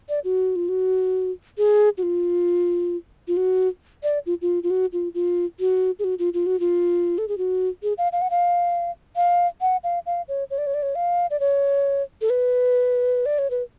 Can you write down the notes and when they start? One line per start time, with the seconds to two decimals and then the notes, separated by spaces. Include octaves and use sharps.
0.09 D5
0.24 F#4
0.56 F4
0.69 F#4
1.58 G#4
1.98 F#4
2.03 F4
3.28 F4
3.37 F#4
4.03 D5
4.26 F4
4.42 F4
4.63 F4
4.70 F#4
4.93 F4
5.14 F4
5.60 F#4
5.99 G#4
6.04 F#4
6.19 F4
6.34 F4
6.46 F#4
6.60 F4
7.18 A4
7.28 G#4
7.38 F#4
7.83 G#4
7.98 F5
8.12 F5
8.22 F#5
8.30 F5
9.16 F5
9.61 F#5
9.84 F5
10.06 F5
10.28 C#5
10.50 C#5
10.58 D5
10.67 C#5
10.74 D5
10.83 C#5
10.95 F5
11.31 D5
11.40 C#5
12.21 A4
12.30 B4
13.26 D5
13.39 C#5
13.50 B4